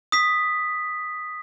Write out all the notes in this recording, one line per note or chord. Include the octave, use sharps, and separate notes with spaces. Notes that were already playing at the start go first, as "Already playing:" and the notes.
D#6 B6